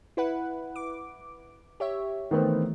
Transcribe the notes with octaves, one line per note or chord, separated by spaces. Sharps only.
E4 B4 F#5
D6
G4 C#5 E5
D#3 E3 A3 B3 C4